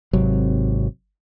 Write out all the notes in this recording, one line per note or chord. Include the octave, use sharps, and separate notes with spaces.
G#1 C3 F#3